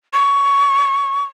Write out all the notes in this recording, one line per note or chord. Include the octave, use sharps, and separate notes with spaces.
C#6